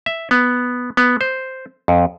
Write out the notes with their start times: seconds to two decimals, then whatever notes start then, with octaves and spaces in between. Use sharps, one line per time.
0.06 E5
0.31 B3
0.97 B3
1.21 C5
1.88 F2